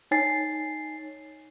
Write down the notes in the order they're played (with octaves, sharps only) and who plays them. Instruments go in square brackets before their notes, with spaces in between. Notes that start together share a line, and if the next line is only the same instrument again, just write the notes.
[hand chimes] D#4 C#5 G#5 A6 C7